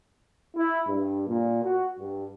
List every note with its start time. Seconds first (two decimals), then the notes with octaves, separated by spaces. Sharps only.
0.56 E4
0.87 G2
1.28 A#2
1.63 F#4
1.99 G2